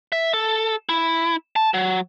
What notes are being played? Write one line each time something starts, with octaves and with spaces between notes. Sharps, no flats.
E5
A4
E4
A5
F#3